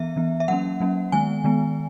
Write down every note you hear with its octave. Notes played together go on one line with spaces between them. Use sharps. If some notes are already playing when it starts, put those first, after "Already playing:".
Already playing: E3 B3 E5
E3 B3
E5
F#3 A#3 C#4 F#5
F#3 A#3 C#4
D#3 G#3 B3 G#5
D#3 G#3 B3